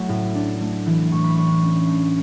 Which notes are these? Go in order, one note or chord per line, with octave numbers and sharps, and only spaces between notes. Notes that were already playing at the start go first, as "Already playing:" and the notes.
Already playing: F#3 A3 E4
A2
D4
A3
E3
A2 C#6
B5
D4 C#6
C#4
A3